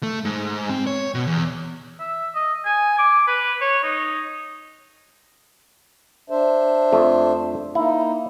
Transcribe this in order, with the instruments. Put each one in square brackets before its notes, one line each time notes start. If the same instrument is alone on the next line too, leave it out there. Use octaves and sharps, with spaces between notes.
[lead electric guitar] A3
G#2
C4
C#5
B2
E2
[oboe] E5
D#5
G#5
D6
B4
C#5
D#4
[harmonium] D4 C5 E5
[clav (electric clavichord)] F2 A3
[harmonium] A#3 D#4 [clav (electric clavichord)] E4